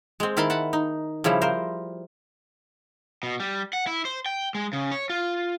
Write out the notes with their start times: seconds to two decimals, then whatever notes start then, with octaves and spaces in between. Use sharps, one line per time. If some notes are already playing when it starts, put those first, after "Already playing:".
0.20 G#3 C4
0.37 D#3 E4 A#4 A5 B5 C6
0.50 F#5 A5 B5
0.73 D#4
1.24 C#3 F3 G3 E4
1.41 A#4 C5
3.23 B2
3.40 G3
3.73 F#5
3.87 E4
4.05 C5
4.26 G5
4.55 G#3
4.73 C#3
4.92 C#5
5.10 F4